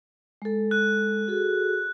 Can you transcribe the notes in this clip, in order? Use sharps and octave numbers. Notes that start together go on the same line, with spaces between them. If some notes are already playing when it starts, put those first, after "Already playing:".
G#3 A4
F#6
F#4 G#4 A4